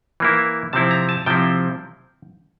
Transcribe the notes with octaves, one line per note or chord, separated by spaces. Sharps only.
E3 A#3 E4
C3 F3 C4 E4 A5
A#5
A5
C3 F3 C4 E4 G5